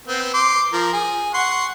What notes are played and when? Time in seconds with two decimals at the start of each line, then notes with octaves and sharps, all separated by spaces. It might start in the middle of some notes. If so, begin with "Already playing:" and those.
0.07 B3 C4
0.34 C6 D6
0.73 F3 A#4
0.93 G#4
1.34 F#5 C6 C#6